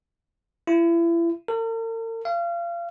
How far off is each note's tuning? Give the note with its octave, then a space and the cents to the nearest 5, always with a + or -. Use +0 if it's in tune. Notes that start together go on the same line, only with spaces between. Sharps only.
E4 +35
A#4 -45
F5 -30